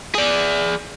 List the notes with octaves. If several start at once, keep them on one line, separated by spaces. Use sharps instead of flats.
G#4 D5